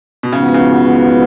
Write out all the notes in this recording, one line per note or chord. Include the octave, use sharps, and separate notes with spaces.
B2
G#2 C#3 F3 B3 F#4
C#3